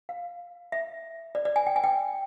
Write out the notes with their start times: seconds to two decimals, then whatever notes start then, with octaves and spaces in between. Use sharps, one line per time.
0.09 F5
0.72 E5
1.35 D5
1.45 D5
1.56 G#5
1.67 G5
1.76 G#5
1.84 G5